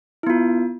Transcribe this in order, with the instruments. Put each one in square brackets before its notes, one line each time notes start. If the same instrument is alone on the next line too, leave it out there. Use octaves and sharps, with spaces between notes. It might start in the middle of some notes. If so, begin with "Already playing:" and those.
[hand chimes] E4
B3
F4